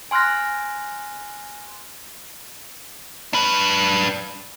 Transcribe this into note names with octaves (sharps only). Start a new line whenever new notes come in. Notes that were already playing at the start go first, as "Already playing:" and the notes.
G#5 C6 F6 F#6 A#6
D4 B4